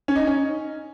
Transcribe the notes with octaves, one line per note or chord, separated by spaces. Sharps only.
C#4
D#4
C#4